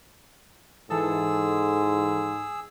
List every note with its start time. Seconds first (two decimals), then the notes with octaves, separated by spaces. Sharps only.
0.90 G#2 E3 G#4 A4 E6